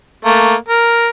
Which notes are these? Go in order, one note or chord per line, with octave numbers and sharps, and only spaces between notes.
A3 A#3
A#4